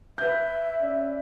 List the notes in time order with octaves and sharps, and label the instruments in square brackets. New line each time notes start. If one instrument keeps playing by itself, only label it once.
[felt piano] B4 G6 [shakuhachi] E5
[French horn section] C#4 D5